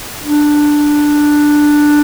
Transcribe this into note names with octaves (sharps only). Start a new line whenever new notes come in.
D4